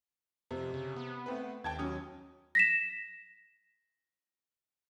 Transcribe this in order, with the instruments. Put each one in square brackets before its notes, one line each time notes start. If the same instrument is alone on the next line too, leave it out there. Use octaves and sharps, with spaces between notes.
[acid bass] F2 [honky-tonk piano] C3
[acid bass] C#3
B3
[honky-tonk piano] A3 C4 B4
[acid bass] D#2 [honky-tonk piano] G5 A5 G#6
[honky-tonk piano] F#3 C#4 D#6
[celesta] A#6 B6 E7